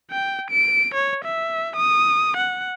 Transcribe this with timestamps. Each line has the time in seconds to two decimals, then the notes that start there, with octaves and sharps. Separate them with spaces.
0.11 G5
0.51 D7
0.95 C#5
1.24 E5
1.76 D#6
2.37 F#5